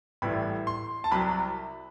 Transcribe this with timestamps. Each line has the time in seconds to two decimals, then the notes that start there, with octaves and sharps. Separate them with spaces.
0.22 A1 A2 E3 G3 B5
0.67 C6
1.04 A5
1.11 C2 C3 F#3 B5